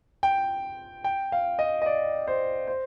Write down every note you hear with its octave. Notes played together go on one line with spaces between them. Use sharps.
G5
G5
F5
D#5
D#5
D5
C5
C5